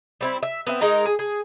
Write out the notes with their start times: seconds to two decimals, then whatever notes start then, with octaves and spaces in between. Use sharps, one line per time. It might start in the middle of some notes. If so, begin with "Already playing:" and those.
0.21 G3 C4 E4
0.43 E5
0.67 B3 C4 E5
0.81 G#3 D#4 A#4 A#5
1.06 G#4
1.19 G#4